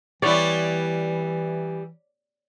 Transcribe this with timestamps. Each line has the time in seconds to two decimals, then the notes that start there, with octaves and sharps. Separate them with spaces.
0.22 E3 G3 B3 E4 C#5 D5